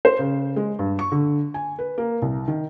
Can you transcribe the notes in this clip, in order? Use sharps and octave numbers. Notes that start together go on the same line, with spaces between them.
C5
C#3
G#3
G2
C#6
D3
G#5
B4
A#3
C2
D#3